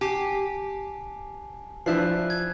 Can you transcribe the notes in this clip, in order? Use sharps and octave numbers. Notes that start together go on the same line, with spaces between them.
G4 G#5 A5 C7
F3 D4 E4 A5 F#6 C7
G#6